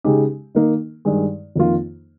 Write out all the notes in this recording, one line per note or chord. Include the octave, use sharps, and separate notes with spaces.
C#3 G#3 D#4 G4
D#3 A#3 D#4
G2 D#3 G#3
F2 D#3 A#3 F4